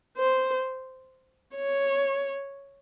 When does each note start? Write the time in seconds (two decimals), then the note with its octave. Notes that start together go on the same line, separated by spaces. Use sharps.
0.17 C5
1.56 C#5